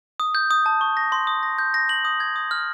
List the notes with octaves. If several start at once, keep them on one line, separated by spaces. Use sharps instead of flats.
D#6
G6
D#6
A5
C#6
A#6
C6
D#6
A#6
G6
A#6
F#7
D#6
G#6
D#6
F6